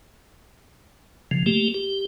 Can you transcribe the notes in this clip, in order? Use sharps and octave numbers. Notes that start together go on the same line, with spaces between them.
C#3 F3
A3 A#3 G4
G4